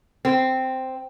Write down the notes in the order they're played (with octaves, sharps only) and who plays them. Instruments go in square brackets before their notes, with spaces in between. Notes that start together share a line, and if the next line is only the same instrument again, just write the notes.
[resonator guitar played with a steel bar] C4